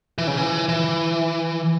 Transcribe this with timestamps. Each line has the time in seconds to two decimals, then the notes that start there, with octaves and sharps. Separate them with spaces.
0.18 E3
0.27 C#3
0.37 E3
0.69 E3